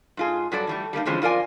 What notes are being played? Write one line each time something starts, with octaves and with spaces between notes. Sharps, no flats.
G#2 F4 G#4
G2 F#3 A4 D5
E3 G3 A3
G3 A3 A#3 D#4
D3 E3 F3 G#3 C4 C#4
F2 F4 A#4 D5 G#5